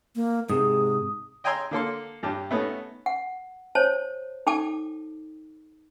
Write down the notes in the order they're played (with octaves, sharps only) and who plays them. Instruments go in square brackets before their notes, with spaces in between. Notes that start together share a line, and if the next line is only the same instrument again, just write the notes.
[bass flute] A#3
[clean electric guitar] G#2 C3 [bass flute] G#4 [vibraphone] D#6
[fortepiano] D#5 G5 G#5 A#5 C6 E6
D3 A#3 A4 C6
G2 G4 A5
A3 B3 C#4 D#4 A4
[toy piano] F#5
C5 C#5 A5
D#4 A4 G5 A5 D6